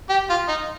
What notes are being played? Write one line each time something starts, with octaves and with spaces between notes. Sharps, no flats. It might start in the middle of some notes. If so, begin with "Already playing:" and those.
G4
F4
D#4